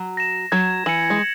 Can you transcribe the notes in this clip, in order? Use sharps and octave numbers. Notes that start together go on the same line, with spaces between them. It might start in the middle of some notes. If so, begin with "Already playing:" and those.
Already playing: F#3
A#6 E7
F#3 G#6
E3 C#7 F#7
G#3